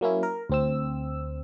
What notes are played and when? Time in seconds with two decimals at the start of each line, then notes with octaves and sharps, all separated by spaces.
0.01 F#3 A#3 C#4 E4
0.23 A#4
0.50 D2 C4 E6